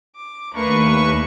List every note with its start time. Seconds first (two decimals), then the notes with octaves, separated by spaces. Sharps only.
0.16 D6
0.54 D#2 A3 A#3 D4 B4 C#6